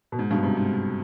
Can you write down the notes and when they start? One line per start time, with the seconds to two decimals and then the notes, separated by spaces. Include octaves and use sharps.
0.12 B2
0.19 G#2
0.31 G2 B2
0.43 G#2 C3
0.57 G#2